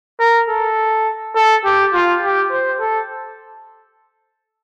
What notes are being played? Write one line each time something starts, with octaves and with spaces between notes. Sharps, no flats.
A#4
A4
A4
G4
F4
G4
C5
A4